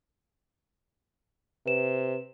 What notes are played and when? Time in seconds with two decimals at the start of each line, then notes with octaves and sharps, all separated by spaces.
1.66 C3 B4 E7